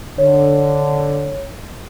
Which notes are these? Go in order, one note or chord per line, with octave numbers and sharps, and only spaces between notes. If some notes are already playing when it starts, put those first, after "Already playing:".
D3 C#5